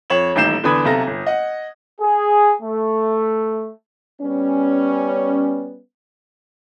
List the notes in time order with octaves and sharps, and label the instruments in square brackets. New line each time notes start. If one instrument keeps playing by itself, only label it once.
[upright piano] F2 C#5 E7 F#7
D#1 A1 D#4 G6 C7 E7
E2 D3 B4 B5 D#6 G#6
B1 C3 A4 A#5 A#6
G1
D#5 F#5
[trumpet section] G#4
A3
[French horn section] G3 B3 C#4